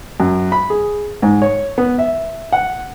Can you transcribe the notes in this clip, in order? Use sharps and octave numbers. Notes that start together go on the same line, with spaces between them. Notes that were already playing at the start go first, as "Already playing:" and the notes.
F#2
B5
G#4
G#2
C#5
B3
E5
F#5